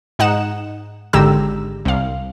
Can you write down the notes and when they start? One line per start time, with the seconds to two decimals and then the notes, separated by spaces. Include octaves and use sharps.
0.19 G#2 D#4 F#5 E7
1.13 G#1 G#2 D3 G4 A#5 E6
1.85 C2 F5